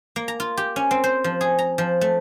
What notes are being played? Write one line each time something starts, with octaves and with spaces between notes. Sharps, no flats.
A#3
A#5
F4
G4
C#4
C4
C5
F3
G#4
A#5
F3
A3